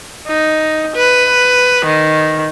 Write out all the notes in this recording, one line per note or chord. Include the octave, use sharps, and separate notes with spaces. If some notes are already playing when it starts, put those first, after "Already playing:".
D#4
B4
D#3